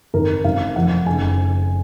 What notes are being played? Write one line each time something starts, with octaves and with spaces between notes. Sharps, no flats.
G#1 G#2 D#3 A#4
G#1 F#2 D#3 F5
F1 F2 D#3 F#5
F#1 C#3 G#5